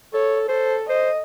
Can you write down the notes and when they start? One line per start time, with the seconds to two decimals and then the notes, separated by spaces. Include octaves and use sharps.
0.13 A4 C#5
0.48 A4 C5
0.89 C5 D#5